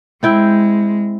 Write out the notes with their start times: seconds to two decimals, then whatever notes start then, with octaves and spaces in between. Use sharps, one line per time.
0.23 G#3 C4 E4 G5